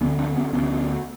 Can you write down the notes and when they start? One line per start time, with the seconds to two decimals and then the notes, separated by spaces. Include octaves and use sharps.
0.01 D2 B3 C#4
0.04 D3
0.18 C4 D4
0.36 B3 C#4
0.53 D2 D3 B3 C#4